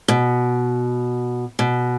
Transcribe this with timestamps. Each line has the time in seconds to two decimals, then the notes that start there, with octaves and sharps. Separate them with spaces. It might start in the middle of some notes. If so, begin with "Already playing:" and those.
0.08 B2
1.59 B2